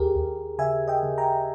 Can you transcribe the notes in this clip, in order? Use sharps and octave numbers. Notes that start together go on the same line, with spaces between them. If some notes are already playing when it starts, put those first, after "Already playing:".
Already playing: D#2 G4 G#4 A#4
D#2
C#3 E5 G#5
D#5 G5
C#3
G5 A#5